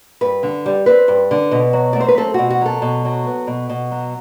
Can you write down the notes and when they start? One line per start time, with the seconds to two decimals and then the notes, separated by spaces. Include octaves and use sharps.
0.21 G2 B4
0.43 D3
0.66 G3
0.86 C4 B4
1.08 G2
1.31 D3
1.51 B2
1.73 F#3
1.93 D5
1.96 A3 C5
2.08 B4
2.17 C4 A4
2.34 B2 F#4
2.50 F#4
2.61 F#3 A4
2.82 B2
3.05 F#3
3.26 B3
3.47 B2
3.69 B2
3.91 F#3